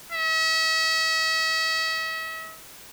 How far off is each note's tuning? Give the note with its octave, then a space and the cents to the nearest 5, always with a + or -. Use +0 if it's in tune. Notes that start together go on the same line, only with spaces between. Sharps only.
E5 -40